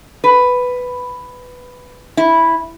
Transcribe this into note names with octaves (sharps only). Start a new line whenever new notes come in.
B4
E4